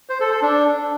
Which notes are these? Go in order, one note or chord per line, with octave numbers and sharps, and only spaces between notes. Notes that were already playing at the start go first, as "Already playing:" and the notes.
C5
A4
A4
D4